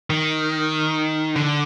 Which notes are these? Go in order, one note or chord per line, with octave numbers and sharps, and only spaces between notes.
D#3
D3